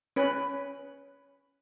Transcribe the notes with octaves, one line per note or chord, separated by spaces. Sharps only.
C#4 B4